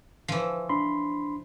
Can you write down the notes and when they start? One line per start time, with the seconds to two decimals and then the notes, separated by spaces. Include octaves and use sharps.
0.28 E3 F3
0.69 D4 B5 C6